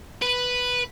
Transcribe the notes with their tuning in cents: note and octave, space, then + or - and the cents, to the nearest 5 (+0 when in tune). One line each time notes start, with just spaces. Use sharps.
B4 +0